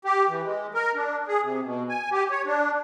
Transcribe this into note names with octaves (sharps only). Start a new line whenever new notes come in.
G4
E3
G#3
A#4
D4
G#4
C3
B2
G#5
G4
C#5
D4